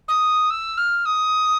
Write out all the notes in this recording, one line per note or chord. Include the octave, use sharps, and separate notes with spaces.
D#6
E6
F6
D#6